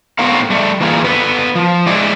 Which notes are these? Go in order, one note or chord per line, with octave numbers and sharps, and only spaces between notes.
A2 B3 C4 F#4 A#4 F5
G3 A3
E3 A#3 F4 G#4
D3 B3 B4
F3
G#3 E4 D5